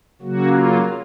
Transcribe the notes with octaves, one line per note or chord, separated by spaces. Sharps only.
C#3 F#3 A#3 F#4
F4